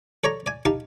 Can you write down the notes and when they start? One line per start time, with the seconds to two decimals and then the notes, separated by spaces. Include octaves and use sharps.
0.24 A4 C#5 D5 A#5
0.46 D5 G#5
0.65 D#4 G4 F5 A5